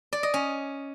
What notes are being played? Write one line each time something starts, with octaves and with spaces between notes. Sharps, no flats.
D5
D#5
C#4